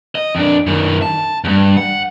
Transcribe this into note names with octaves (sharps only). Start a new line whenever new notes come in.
D#5
F2 D4
F#2 D#3
A5
E2 G2
F#5